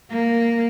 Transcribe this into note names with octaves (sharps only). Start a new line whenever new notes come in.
A#3